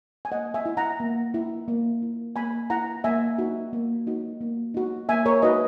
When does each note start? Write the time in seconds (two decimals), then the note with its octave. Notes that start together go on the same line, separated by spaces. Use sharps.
0.25 G#5
0.31 A#3 D#5 F#5
0.54 E5 G#5
0.66 E4
0.77 F#5 A#5
1.00 A#3
1.34 E4
1.68 A#3
2.02 E4
2.36 A#3 G#5 B5
2.70 E4 F#5 A#5
3.04 A#3 E5 G#5
3.38 D#4 F#4
3.73 A#3
4.07 D#4 F#4
4.41 A#3
4.74 D#4 F#4
5.09 A#3 E5 G#5
5.26 A#4 C#5
5.42 D#4 F#4 B4 D#5